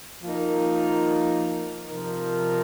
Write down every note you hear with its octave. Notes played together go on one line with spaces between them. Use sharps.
F3 A#3 D#4 A#4
C3 F3 D#4 A#4